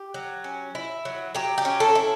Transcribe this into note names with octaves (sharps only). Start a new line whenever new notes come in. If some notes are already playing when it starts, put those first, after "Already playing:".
Already playing: G4
F#3
C#4
E4
F#3
F#3 G4
G4
C#4
A4
E4